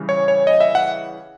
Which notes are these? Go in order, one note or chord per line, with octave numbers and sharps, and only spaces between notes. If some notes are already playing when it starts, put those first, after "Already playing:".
Already playing: C#3 E3 G3
C#5
C#5
D#5
E5
F#5